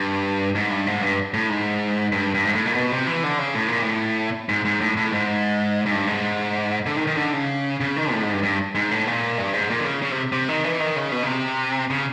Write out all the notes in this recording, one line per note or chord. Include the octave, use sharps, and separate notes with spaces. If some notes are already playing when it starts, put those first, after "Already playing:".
Already playing: G2
G#2
G2
G#2
G2
A2
G#2
G2
G2
G#2
A2
A#2
B2
C3
E3
D3
C#3
A2
A#2
A2
G#2
G#2
A2
A2
G#2
G#2
G2
G#2
D3
D#3
D#3
D3
C#3
C#3
D#3
A2
G#2
G2
G2
G#2
A2
A#2
G2
G#2
A#2
D3
C#3
C#3
C3
C3
D#3
E3
D#3
C#3
B2
C#3
C3
C#3